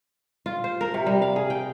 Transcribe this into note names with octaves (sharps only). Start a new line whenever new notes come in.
F4
C5
A#4
C3
G3
F5
G#4
G5